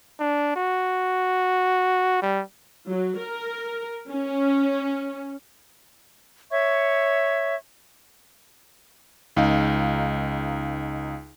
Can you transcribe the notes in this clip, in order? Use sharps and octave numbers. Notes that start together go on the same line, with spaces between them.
D4
F#4
G3
F#3
A#4
C#4
C#5 E5 C#6 G#6
C#2 D#4 F5